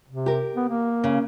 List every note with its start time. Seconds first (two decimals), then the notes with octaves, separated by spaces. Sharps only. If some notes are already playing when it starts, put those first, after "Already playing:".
0.08 C3
0.26 G4 A#4
0.56 B3
0.68 A#3
1.04 C#3